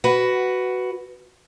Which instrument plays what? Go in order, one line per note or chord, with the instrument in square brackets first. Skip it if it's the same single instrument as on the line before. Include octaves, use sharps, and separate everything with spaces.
[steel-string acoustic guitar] F#4 B4